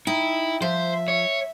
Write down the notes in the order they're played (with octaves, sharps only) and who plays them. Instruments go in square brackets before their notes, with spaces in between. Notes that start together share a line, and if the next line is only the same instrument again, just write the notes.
[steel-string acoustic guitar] D#4 G5 [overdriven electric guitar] E4
[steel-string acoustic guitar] F3 [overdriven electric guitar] C5 [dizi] E5
[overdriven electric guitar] C#5